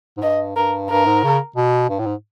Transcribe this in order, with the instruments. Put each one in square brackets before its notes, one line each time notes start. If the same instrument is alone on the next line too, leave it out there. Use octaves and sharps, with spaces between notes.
[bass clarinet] G#2
[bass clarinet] G2 [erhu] D#5
[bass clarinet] G2 [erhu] A#4
[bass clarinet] G2 [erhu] A#4
[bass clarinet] G#2
C#3
B2
G2
A2
G#2